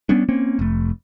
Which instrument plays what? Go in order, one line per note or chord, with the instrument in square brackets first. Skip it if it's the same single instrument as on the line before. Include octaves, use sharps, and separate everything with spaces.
[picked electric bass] G3 B3 C#4 D4
A#3 C4 C#4
F1 A3